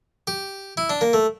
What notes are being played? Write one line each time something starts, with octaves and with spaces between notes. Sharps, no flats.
G4
E4
D4
A#3
A3